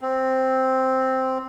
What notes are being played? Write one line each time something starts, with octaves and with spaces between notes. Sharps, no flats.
C4